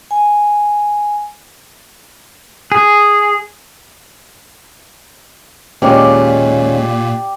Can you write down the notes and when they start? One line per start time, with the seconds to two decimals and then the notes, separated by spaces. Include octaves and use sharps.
0.11 G#5
2.72 G#4
5.82 D#2 A#2 G#3 C#4 G4 D5